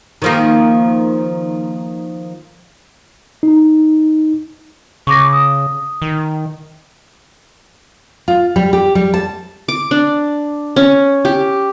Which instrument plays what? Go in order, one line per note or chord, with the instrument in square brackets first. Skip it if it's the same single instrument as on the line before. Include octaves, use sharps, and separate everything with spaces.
[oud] D#3 F3 A#3
[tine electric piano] D#4
[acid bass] C#3 [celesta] C#6 D6 A#6
[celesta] D#6
[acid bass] D#3
[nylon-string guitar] F4
G3
G4
G3
A5
[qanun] D6
D4
C#4
G4